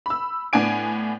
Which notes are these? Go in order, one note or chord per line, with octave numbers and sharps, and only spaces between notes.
B5 E6
A2 B3 D4 G#5 D7